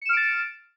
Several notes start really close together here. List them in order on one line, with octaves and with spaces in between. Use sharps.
C#7 E7 F6 D7 A6